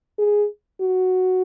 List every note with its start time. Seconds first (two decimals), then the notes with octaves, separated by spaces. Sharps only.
0.19 G#4
0.81 F#4